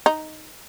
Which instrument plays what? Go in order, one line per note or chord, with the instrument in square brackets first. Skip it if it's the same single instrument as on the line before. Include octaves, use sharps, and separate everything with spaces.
[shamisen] D#4